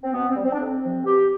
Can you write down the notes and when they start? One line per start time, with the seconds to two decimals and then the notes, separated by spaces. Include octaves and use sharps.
0.03 C4
0.14 B2 B3
0.30 C4
0.36 G3
0.45 C4
0.53 D4
0.59 F2 C4
0.83 C3 F3
1.05 B2 G4